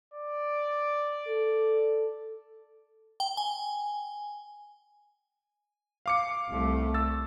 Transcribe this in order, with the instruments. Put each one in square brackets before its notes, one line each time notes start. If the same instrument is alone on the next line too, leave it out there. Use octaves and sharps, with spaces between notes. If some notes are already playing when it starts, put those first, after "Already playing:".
[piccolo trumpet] D5
[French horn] A4
[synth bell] G5
G#5
[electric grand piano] F5 D6 C#7
[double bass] C2 A3
[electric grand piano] E6 A6